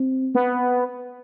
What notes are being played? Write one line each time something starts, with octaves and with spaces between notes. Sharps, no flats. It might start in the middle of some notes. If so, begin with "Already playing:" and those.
Already playing: C4
B3